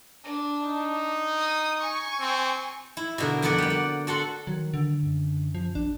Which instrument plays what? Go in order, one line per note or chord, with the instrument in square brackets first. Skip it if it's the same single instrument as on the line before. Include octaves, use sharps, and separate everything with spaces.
[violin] D4
[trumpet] D#4
[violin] D#6
G#5 C#6
[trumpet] C4
[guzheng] E4
B2 D3 A#4
F2 B3 A#4 B4 D5 F#5
G3 F#5
D5
F#4 A4 F#5 C6
[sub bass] D#3 [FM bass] F#3
[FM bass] D3
[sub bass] F#2
[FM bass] F3
[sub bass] A#1 [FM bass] D4